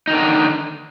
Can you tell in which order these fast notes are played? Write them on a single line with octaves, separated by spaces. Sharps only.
D#4 D#3 D3